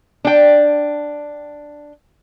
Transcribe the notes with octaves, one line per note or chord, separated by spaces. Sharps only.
D4 G5